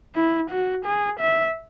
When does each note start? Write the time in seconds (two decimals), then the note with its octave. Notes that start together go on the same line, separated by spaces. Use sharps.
0.15 E4
0.50 F#4
0.85 G#4
1.19 E5